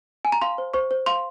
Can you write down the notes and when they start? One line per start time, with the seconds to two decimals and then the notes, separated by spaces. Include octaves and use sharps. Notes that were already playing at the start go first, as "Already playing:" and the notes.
0.25 G#5
0.32 A#5
0.41 F5 C6
0.58 C5
0.74 C5 C#6
0.91 C5
1.06 F5 C6